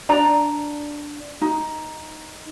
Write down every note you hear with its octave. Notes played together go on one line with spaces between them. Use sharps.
D4 D5 A#5
D#4